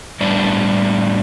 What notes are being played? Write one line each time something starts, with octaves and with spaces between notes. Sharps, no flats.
A2 G3 B3 D4 D5